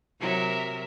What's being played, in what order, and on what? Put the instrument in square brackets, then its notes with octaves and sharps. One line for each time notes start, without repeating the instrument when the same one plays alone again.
[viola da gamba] C3 F#3 [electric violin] A#4 E5